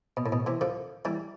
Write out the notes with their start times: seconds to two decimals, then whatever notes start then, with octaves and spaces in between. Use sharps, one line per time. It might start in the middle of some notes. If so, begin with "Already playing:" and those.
0.17 B2
0.26 A2
0.32 B2
0.46 C3 E3
0.61 D3 F3
1.05 E3 G3